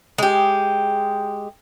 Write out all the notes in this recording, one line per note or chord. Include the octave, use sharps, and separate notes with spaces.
G#3 G4